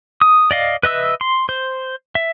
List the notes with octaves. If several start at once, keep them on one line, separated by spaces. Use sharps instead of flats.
D#6
D5 D#5 F5
B4 D#5 E5 E6
C6
C5
E5